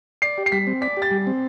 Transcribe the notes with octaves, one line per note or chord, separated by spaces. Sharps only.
D5 C7
G4
C7
G3 B6
C4
D5 B6
G4
A6
G3
C4